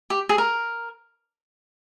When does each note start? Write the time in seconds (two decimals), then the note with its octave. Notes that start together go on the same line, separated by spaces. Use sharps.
0.10 G4
0.29 G#4
0.38 A#4